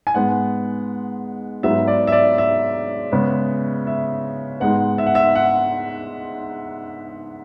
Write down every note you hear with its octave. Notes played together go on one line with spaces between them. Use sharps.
G#5
G#2 G#3 B3 F#5
G#2 F#3 B3 E5
D5
E5
D5
E5
C#3 G#3 B3
E5
G#2 G#3 B3 F#5
E5
F#5
E5
F#5